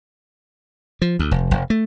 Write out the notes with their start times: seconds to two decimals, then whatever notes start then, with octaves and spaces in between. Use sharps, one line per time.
1.02 F3
1.19 D2
1.31 F1
1.51 F1
1.70 A3